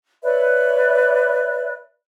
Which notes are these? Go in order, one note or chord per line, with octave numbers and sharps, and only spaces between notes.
B4 C#5 D5 E5